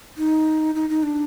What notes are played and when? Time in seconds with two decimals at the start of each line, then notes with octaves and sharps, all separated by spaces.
0.17 D#4
0.75 D#4
0.90 D#4
1.03 D4